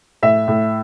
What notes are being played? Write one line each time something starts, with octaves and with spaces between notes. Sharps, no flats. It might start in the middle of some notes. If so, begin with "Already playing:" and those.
A2 E5
A2